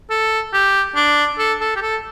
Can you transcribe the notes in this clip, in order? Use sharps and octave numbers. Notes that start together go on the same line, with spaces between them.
A4
G4
D4
A4
A4
G4
A4